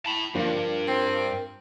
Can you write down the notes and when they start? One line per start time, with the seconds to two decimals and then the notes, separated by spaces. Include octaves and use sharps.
0.06 E4 A5 B5
0.35 G2 F3 D4 F4 A#4
0.88 C4